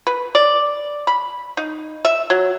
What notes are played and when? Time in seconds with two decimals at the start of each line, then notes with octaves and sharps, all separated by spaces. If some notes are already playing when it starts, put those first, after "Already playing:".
0.07 B4
0.35 D5
1.07 B5
1.57 D#4
2.05 E5
2.30 F#3